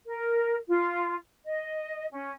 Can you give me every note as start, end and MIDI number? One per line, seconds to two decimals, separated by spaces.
0.06 0.55 70
0.68 1.14 65
1.45 2.06 75
2.11 2.30 61